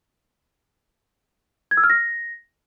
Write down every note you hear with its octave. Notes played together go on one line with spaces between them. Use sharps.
G#6
E6
F6
A#6